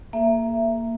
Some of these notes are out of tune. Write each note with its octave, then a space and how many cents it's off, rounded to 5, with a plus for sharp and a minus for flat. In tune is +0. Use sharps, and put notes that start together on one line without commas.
A#3 +0 G#4 +35 E5 +20